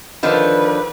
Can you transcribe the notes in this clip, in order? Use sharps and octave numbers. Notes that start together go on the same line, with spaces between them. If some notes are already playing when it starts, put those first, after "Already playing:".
D3 D#3 F3 B4